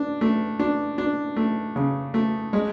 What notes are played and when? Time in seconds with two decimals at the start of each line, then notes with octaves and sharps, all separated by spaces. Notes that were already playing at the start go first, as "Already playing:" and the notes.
Already playing: D4
0.21 A3
0.59 D4
0.98 D4
1.36 A3
1.76 C#3
2.14 A3
2.53 G#3